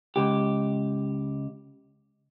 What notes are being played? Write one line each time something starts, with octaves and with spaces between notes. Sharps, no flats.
C#2 G4